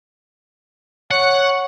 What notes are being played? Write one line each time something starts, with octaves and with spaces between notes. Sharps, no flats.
C#5 F#5